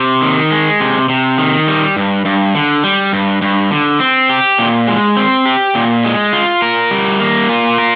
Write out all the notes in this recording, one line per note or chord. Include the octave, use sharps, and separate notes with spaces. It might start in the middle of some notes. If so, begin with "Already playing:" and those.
Already playing: C3
D#3
G#3
C3
C3
D#3
G3
G2
G2
D3
G3
G2
G2
D3
C4
G4
A#2
G#3
C4
G4
A#2
G#3
F4
A#4
G3
A#3
F4
A#4